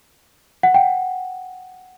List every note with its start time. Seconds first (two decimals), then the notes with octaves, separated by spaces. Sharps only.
0.63 F#5
0.74 G5